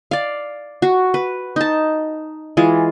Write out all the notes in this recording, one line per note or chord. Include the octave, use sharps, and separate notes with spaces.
D5 F5
F#4
B4
D#4 A5
E3 G#3 F4